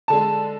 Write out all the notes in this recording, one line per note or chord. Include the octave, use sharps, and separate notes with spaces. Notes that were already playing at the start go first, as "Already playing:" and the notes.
D3 G#3 A5